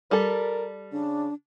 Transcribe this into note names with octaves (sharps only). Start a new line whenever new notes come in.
G3 A4 A#4
C#3 D4